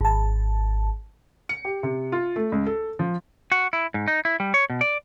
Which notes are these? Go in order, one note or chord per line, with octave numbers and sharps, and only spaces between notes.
G#1 A5
C#7
G4
C3
F4
A3
C#2
A4
F3
F#4
E4
G#2
D#4
E4
G3
C#5
B2
D5